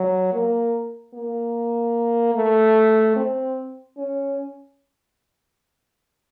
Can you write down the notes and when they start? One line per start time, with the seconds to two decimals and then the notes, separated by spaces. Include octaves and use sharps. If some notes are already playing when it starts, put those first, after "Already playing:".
Already playing: F#3
0.33 A#3
1.14 A#3
2.35 A3
3.16 C4
3.97 C#4